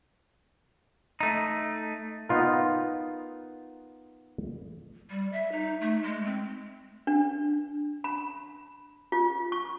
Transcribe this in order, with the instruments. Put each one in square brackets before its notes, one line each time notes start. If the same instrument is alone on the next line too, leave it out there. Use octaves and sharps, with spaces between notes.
[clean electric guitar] A3 D#4
[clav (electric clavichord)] B3 D#4 F4 A#4
[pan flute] G3
E5
D#4
A3
G#3
C4
[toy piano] D4
B5
F4
C#6